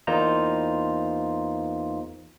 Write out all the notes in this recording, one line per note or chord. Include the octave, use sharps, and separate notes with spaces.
E2 A#3 D#4 F4 C5 A#5